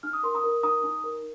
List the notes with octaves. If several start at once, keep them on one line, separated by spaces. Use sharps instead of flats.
D#4 F6
D#6
A#4 C6
A#5 D#6
A#4
D#4 A#5 D#6
D#4
A#4